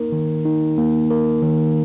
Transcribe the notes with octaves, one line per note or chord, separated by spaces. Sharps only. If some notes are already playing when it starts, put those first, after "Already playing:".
Already playing: A#3 D#4 A#4
D#3
D#4
A#3
A#4
D#3